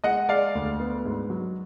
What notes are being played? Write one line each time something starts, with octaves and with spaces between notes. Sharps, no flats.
G#3 D#5 F#5
G#3 D5 F5
D2
B3
G#2
F#3